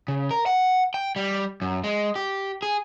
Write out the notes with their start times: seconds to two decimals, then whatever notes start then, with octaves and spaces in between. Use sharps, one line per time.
0.08 C#3
0.31 A#4
0.46 F#5
0.94 G5
1.16 G3
1.62 F#2
1.84 G#3
2.16 G4
2.63 G#4